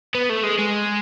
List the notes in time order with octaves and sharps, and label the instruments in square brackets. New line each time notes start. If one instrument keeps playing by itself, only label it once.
[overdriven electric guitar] B3
A3
G#3
G#3